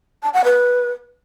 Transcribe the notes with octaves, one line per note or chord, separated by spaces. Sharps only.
A5
F#5
B4